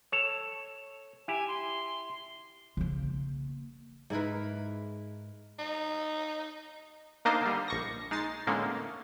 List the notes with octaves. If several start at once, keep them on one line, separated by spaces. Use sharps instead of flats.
A4 C#5
E4 G4 G#5
C6
C#3 A#3
G#2 E4 A#4 B4
D#4
A#3 D4 D#4 C5 D#5 F5
D3 G3
A#1 C#6 A#6
G#3 D#4 A6 C7
E2 A2 D3 G#3 A#3 C#4